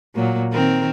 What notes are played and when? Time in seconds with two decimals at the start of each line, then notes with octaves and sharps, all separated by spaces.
0.15 A#2 F#3 A#3
0.52 D#3 C4 A#4